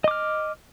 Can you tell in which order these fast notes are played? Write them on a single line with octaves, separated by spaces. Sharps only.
D#5 D6 F6